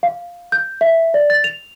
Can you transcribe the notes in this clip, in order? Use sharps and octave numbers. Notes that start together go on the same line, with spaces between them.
F5
G6
E5
D5
A6
F7